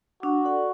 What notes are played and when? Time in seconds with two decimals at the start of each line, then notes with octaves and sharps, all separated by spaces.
0.23 D4 F#4
0.45 A4 D5 F#5